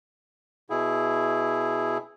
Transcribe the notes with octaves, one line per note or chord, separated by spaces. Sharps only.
B2 E4 G#4